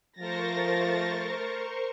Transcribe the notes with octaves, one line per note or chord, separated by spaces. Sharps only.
F3 A3 A#4 C5 C#6 A6 A#6